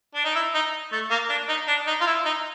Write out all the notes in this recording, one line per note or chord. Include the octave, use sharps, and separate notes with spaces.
D4
D#4
E4
D#4
A3
A#3
D4
D#4
D4
D#4
F4
E4
D#4